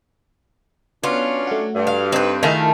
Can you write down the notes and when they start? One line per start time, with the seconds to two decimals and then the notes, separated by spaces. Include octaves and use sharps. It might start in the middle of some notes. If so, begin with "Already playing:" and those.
1.04 F#3 B3 C#4 D4 F4
1.47 A3 F#4
1.75 G2
1.87 F5
2.12 C4 D#4 B4
2.43 D#3 A3 E4 F4 G#4 F5